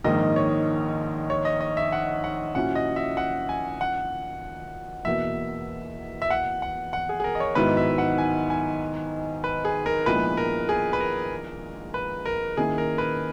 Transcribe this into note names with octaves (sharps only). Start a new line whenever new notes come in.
A#1 G#2 D#3 A#3 D#5
C#5
C#5
D#5
D#5
E5
F#5
F#5
A#2 F#3 C#4 E4 F#5
D#5
E5
F#5
G#5
F#5
E2 B2 A#3 E5
E5
F#5
F#5
F#5
G#4
G#4
A#4
D#5
C#5
G#2 D#3 F#3 B3 E4 B4
E5
F#5
G#5
G#5
B4
G#4
A#4
A#1 A#2 G#3 B3 E4 B4
A#4
G#4
B4
A#4
B4
A#4
D#3 A#3 C#4 E4 G#4
A#4
B4